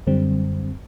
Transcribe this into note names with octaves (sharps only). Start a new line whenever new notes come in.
F#2 D3 G3 C4